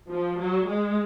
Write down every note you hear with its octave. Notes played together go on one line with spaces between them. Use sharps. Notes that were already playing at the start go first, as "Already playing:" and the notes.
F3
F#3
G#3